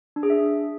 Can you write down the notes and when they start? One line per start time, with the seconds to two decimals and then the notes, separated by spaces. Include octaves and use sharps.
0.16 D4
0.23 G#4
0.30 E5